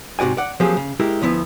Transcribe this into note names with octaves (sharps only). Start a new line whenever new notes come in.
G#2 C3 F#4 D5 G#5
D5 F#5
F3 F#3 A#3 C4 G4 G#4
C#3
G#3 E4 G4 A#4
D2 F3 B3 E4